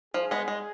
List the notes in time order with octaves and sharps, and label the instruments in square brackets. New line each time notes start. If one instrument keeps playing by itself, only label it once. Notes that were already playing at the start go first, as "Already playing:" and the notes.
[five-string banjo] F3 [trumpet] G#4
[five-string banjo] G#3 B3
G#3